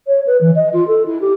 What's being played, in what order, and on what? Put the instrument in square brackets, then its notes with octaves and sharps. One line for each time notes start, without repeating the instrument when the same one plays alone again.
[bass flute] C#5
B4
E3
D#5
F4
A4
E4
G4